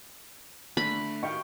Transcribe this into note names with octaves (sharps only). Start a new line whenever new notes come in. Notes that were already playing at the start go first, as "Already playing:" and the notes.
D3 A3 D4 B5
A2 D#3 F5 G5 C#6